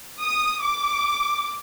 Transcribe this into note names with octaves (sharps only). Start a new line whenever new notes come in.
D#6
D6